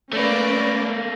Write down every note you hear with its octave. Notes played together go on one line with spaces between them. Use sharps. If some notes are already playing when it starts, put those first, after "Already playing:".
A3 A#3 C#4 B4 D5